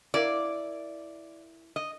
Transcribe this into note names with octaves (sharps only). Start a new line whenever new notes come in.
E4 A#4 D5 F5
D#5